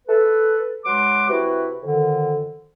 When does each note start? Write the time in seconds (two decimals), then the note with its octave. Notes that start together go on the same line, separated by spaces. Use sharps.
0.08 A4 B4
0.85 F#3 G#3 B4 C6 D6
1.29 C3 E4 F#4 G4 B4
1.82 F2 D3 D#3